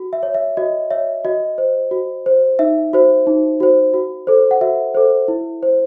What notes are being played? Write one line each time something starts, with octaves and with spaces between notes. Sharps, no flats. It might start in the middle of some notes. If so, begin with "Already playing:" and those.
Already playing: F#4
E5
C#5
E5
F#4 D#5
C#5 E5
F#4 D#5
C5
F#4
C5
D#4 E5
F#4 C5
D#4
F#4 C5
F#4
A4 C5
F#5
F#4 E5
A4 C5
E4
C5